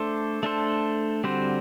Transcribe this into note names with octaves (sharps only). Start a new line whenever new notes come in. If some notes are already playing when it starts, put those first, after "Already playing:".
Already playing: A3 D4 A4 C5
A3 D4 A4 C5
D3 G3 C4 F#4 C5